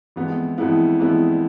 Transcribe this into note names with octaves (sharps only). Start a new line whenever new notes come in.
F2 E3 G#3 B3 E4
F2 E3 G#3 B3 E4
F2 E3 G#3 B3 E4